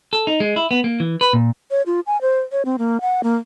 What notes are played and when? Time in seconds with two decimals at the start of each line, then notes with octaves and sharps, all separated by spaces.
0.13 A4
0.27 D#4
0.40 G#3
0.56 E4
0.71 B3
0.84 A#3
1.00 E3
1.21 B4
1.33 A#2
1.71 C#5
1.86 F4
2.07 G#5
2.21 C5
2.52 C#5
2.65 C4
2.78 A#3
3.01 F#5
3.23 A#3